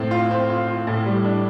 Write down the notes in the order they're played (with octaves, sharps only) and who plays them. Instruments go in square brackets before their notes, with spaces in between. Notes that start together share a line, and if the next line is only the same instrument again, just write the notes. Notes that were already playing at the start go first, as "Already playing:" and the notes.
Already playing: [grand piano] A2 C4
F4
C4
F4
F4
A2
G3
D4